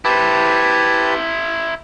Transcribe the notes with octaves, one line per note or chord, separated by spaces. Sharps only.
E4 G4 B4 C5 A5